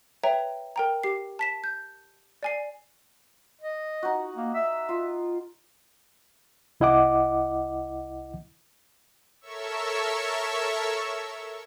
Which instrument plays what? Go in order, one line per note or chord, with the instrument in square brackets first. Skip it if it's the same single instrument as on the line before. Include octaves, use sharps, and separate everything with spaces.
[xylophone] B4 C#5 E5 G5 A#5
A#4 G5 A#5
G4 C7
A5 B6 E7
G6
D5 G#5 C7
[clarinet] D#5
[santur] D#4 F#4
[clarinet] A#3
E5
[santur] F4
[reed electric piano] C2 E4 D#5 F#5 D6
[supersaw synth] A4 A#4 C#5 E5 C#6 E6